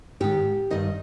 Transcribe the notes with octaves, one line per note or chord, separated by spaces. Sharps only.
G#2 D#3 G4
G2 D#3 D#5